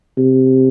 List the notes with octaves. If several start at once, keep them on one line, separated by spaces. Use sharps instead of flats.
C3